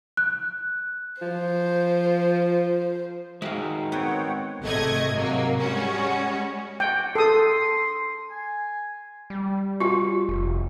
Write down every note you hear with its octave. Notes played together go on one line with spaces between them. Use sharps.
F#6
F3 C5
D#3 G#3 F#4 E5 F5
B3 C4 C#5 F#5 G5
G#1 C3 A3 D#5 G#6
G#2 C3 F#3 A#3
G3 G#3 C#4 F#4
F#4 G5
A4 C6 D#6
G#5
G3
F4 F#4
F1